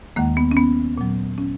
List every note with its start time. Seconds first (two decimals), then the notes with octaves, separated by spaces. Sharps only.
0.16 D#2 D#3 G#3 A#3
0.37 B3
0.51 C#4
0.57 B3
0.98 A#2 F#3
1.38 C#4